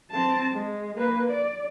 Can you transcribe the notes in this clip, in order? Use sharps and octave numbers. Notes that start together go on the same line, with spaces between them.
C4 A5
G#3
A#3 B4
D5